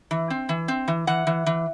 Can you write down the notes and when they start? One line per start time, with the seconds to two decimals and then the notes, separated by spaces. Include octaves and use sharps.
0.11 E3
0.30 C4
0.49 E3
0.68 C4
0.88 E3
1.07 E3 F#5
1.27 E3
1.46 E3